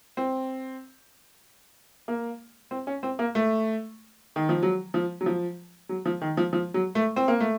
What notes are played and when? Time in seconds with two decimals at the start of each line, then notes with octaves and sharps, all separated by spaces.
0.17 C4
2.08 A#3
2.71 C4
2.87 C#4
3.03 C4
3.19 A#3
3.35 A3
4.36 D#3
4.49 F3
4.63 F#3
4.94 F3
5.21 F#3
5.26 F3
5.89 F#3
6.06 F3
6.21 D#3
6.37 F3
6.53 F3
6.74 F#3
6.95 A3
7.16 C4
7.28 A#3
7.40 A3